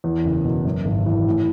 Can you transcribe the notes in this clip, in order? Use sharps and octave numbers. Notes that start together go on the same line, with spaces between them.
E2
F#1
B2
F#2
G#1
E3
A2